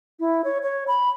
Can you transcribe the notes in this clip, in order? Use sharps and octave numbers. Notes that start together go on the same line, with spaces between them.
E4
C#5
C#5
B5